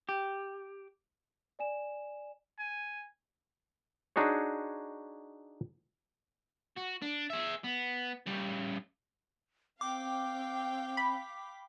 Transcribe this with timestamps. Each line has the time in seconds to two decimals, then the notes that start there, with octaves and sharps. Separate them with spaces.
0.09 G4
1.59 D5 G#5 E7
2.59 G#5
4.16 D4 D#4 F#4 G#4 C#5
6.77 F#4
7.02 D4
7.30 G#4 E5
7.64 B3
8.27 C#3 G3
9.81 C4 F5 G5 D6
10.97 B5